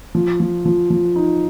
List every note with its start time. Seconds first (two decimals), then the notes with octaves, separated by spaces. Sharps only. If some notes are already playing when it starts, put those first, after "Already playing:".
0.15 F3
0.40 F3
0.65 F3
0.90 F3
1.16 D#4